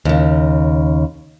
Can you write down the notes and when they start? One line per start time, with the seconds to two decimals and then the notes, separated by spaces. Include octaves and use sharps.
0.05 D#2 C#3